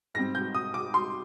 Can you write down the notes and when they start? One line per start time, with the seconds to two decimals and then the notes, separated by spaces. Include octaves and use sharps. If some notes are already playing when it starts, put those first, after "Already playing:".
0.14 G#2 G3 C4 A#6
0.35 G6
0.55 D#6
0.74 D6
0.94 C6